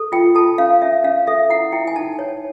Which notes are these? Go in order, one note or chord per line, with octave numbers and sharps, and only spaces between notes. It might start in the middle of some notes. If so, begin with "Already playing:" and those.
Already playing: A4
F4 G5
A4 A5
C#4 F5
C#4 E5
C#4 F5
A4 E5
E4 F#5
E4 G5
G#5
D#4 A5
C#5